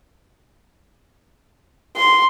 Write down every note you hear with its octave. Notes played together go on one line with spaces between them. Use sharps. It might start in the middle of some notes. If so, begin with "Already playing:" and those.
C6